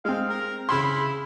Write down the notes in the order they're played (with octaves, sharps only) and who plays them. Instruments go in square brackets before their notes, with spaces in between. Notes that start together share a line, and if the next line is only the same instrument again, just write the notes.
[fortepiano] G#3 C4 [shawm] F5
[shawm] A#4
[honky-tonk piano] C#3 B5 C6 [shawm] E4